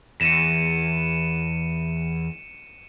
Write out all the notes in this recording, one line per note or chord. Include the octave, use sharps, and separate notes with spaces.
E2 C#7 D#7 E7